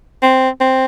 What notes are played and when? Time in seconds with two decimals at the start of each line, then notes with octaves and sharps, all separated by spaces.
0.22 C4
0.60 C4